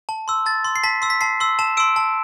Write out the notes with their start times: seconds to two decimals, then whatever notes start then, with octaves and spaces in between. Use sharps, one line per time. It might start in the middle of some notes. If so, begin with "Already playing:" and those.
0.09 A5
0.28 C6 E6
0.46 A5 A6
0.65 C6 E6
0.76 C7
0.83 A5 B6
1.02 C6 E6
1.10 B6
1.21 A5 C7
1.40 C6 E6
1.59 A5 E7
1.77 C6 E6 D7
1.96 A5